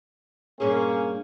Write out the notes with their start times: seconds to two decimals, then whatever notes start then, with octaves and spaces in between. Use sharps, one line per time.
0.60 G2 A#2 A#3 C#4 G#4